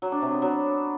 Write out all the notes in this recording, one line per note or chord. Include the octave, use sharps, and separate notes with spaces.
F#3
D4
C3
B3
F#3